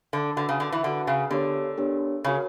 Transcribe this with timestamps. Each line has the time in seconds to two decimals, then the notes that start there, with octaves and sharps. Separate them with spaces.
0.13 D3
0.36 D3 F#4 B4 F#5
0.49 C#3
0.60 D3
0.72 E3
0.83 D3 F#4 B4 F#5
1.07 C#3
1.31 D3 B3 D4 G4 A#4 C#5
1.78 B3 D4 G4 A#4 C#5
2.24 C#3 F#4 A#4 C#5